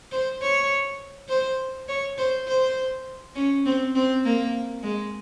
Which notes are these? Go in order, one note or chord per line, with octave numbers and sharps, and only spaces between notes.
C5
C#5
C5
C#5
C5
C5
C#4
C4
C4
A#3
G#3